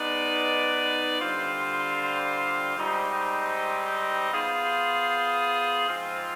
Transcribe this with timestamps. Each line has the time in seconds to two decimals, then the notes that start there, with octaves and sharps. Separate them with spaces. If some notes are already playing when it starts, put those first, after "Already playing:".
Already playing: G#3 B3 D#4 B4 D5
1.19 D3 G3 C4 F4 C5
2.76 G#2 G3 C4 D#4
4.30 B3 F4 G#4 C5
5.86 G#2 F3 C4 F4